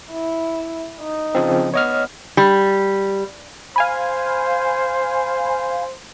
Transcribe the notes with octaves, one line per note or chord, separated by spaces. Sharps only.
E4
D#4
C#3 F3 C4
B3 C#5 D#5 F6
G3
C5 F5 G#5 B5